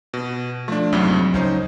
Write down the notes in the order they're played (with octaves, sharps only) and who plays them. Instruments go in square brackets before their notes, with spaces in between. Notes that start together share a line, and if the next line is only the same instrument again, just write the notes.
[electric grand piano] B2
[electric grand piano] F3 D4 [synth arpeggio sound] A3
[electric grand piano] C2 F2 G#2 [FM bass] F#3
[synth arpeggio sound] C#2 [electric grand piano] C#4 D#4 C5